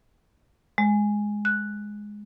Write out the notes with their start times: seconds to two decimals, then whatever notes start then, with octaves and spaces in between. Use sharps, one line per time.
0.78 G#3
1.45 F#6